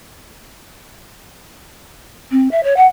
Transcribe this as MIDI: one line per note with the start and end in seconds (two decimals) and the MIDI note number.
2.31 2.50 60
2.51 2.63 76
2.63 2.76 73
2.76 2.86 78